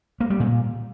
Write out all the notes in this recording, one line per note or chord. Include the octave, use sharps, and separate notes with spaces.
A#3
G3
A#2